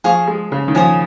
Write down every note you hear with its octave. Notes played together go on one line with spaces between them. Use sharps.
F3 G#4 F5 C#6
G#3
C#3
D#3
F3 C#5 G#5 D#6